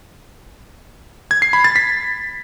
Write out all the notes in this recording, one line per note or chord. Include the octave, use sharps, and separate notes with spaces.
G#6
C7
B5
A6
B6